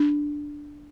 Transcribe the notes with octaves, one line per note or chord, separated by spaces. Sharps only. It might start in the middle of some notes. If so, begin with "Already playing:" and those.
Already playing: D4